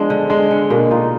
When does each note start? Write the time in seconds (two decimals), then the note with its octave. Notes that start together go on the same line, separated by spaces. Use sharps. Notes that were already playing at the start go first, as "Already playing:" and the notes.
Already playing: F3 G#3 B3 D4
0.10 D3
0.30 G#3 D4
0.51 D3
0.70 B2 A#3
0.91 D#4 F4